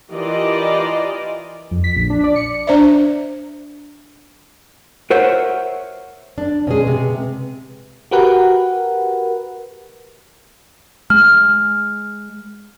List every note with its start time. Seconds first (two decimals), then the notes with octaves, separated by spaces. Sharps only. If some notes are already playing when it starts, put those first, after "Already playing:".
0.12 E3 F4 G4 A#4 D5 D#5
1.71 F2
1.84 B6
1.96 A#1
2.10 D4
2.24 D5
2.36 C#7
2.67 D4 C5 D5 E5
5.10 A#4 C5 C#5 E5 F#5
6.38 D4
6.67 B2 G#3 C#4 G#4
6.87 C3
8.11 F#4 G4 A#4 B4 F#5
11.10 G#3 F6